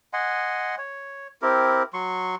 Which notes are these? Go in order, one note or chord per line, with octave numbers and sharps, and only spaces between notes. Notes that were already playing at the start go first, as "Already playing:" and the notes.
D#5 F#5 G#5 C6
C#5
C4 E4 G4 A#4
F#3 C6 C#6